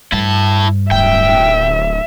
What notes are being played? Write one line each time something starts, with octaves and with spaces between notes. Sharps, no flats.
G2 E4 A5
D1 E5 G5